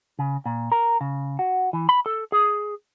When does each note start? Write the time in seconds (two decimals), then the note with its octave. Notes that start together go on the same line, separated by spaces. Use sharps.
0.19 C#3
0.46 A#2
0.72 A#4
1.01 C#3
1.39 F#4
1.73 E3
1.89 B5
2.06 A4
2.32 G#4